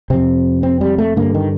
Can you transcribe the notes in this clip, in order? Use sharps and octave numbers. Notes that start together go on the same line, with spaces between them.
F2 C3 C4
C4
G3
A3
G2 D3 A#3
D#3